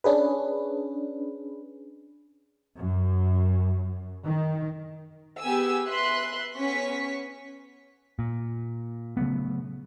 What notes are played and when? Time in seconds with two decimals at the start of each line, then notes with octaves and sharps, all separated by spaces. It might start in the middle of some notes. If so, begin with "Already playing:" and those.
0.04 C#4 D4 G#4 B4
2.78 F#2
4.25 D#3
5.41 B3 G4 G#4 G#5 E6
5.87 B4 E5 C6 F#6
6.56 B3 C#4 C#6 B6
8.19 A#2
9.17 C#3 F#3 A3 B3